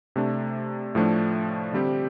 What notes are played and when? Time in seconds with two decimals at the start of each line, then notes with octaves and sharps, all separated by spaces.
0.16 C3 A3 D4
0.95 A2 F3 A3 D4
1.73 D3 G3 C4 G4